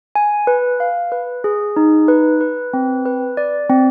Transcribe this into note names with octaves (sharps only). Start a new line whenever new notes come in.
G#5
B4
F5
B4
G#4
D#4
B4
B4
C4
B4
D5
C4